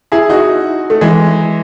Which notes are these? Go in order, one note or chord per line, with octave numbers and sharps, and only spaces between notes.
E4 G#4
D#4 F#4
A3
E3 G#3